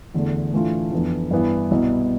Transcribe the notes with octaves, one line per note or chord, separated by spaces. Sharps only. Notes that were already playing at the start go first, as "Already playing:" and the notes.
E2 D3 A3
A2 E3 A3 D4 F4
F2 E3 B3 D4
G2 E3 B3 E4
C2 B2 B3